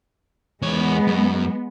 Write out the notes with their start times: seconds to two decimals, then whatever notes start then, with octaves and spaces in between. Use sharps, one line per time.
0.62 E2 G#3 B3 C#5
1.07 F#2